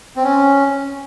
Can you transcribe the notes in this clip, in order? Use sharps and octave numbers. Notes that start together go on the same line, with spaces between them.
C4
C#4